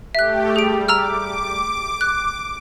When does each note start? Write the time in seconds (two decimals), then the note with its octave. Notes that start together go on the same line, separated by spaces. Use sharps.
0.15 A3 G4 E5 F#6
0.56 G3 G#4 D7
0.88 A#5 D6 E6 F6
2.01 F#6